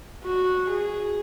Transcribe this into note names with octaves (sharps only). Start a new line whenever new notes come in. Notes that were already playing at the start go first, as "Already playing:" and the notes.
F#4
G#4